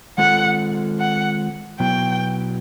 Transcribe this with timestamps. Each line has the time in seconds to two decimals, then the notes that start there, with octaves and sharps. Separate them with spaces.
0.18 D#3 G#3 C4 F4 A4 F#5
0.99 F#5
1.80 B2 F#3 B3 E4 G5